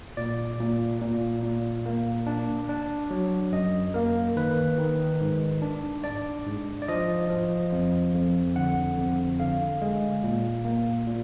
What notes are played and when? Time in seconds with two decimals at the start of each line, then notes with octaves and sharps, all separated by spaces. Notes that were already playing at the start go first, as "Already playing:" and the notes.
0.17 A#2 D5
0.60 A#2
1.01 A#2
1.43 A#2
1.86 A#3
2.27 D4
2.69 D4
3.10 F#3
3.52 F#2 D#5
3.94 A#3 A#4
4.36 D#3 B4
4.78 D#3
5.21 G#2
5.62 D4
6.04 D4 D5
6.46 G#2
6.82 D5
6.88 F3 D#5
7.30 F3
7.72 F2
8.14 F2
8.56 D3 F#5
8.97 F2
9.39 D3 F5
9.81 G#3
10.23 A#2
10.65 A#3
11.06 A#2